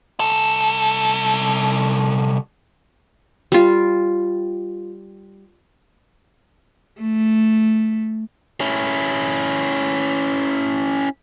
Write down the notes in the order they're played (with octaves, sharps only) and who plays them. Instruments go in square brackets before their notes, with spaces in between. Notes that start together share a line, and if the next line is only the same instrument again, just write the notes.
[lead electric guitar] C2 A4
[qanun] G3 F4
[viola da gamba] A3
[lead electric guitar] C#4 E4